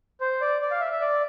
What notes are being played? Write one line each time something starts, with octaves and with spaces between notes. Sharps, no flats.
C5
D5
D5
F5
E5
E5
D5